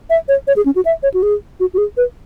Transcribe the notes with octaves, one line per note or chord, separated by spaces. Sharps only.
E5
C#5
C#5
G#4
C#4
F#4
E5
C#5
F#4
G#4
F#4
F#4
G#4
B4